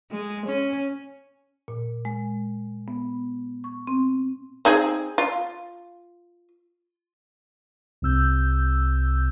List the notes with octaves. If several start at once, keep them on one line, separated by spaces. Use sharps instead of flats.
G#3
C#4
A#2
G#3
B3
C#6
C4
C4 D#4 G#4
F4
C2 C3 E6 G6